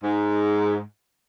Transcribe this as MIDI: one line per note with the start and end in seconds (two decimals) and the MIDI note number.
0.04 0.80 44